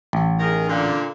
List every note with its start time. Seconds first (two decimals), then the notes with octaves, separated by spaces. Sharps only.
0.13 A1
0.39 D#3 G#4 A#4
0.68 A#2 D3